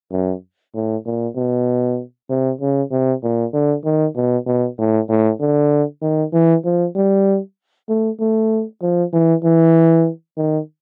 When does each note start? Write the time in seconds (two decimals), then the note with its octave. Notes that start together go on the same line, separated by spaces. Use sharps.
0.12 F#2
0.75 A2
1.06 A#2
1.36 B2
2.30 C3
2.61 C#3
2.91 C3
3.23 A#2
3.53 D3
3.85 D#3
4.16 B2
4.46 B2
4.78 A2
5.09 A2
5.40 D3
6.02 D#3
6.33 E3
6.65 F3
6.95 G3
7.89 A3
8.20 A3
8.82 F3
9.13 E3
9.44 E3
10.37 D#3